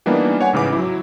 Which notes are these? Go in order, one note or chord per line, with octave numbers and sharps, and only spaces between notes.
E3 G3 A#3 B3 D4 D#4
C#5 F#5 G#5
A1 G#2 C#3 E3 B4 D6
F#3 E4